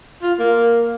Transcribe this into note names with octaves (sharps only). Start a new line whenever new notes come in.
F4
A#3